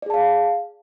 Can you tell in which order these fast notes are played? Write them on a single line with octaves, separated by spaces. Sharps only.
D5 G#4 A5 F5